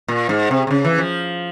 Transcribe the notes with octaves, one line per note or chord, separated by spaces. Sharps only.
A#2
G#2
C3
C3
C#3
E3
F3